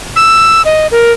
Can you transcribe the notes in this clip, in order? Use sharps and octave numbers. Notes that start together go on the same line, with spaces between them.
E6
D#5
A#4